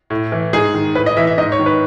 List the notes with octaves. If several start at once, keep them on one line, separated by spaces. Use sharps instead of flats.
A2
E3
G#2 G#4
D#3
A2 B4
D#5
E3 E5
E5
G#2 D#5
C#5
D#3
B4